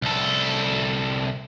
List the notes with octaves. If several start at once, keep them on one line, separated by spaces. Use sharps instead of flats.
C2 A4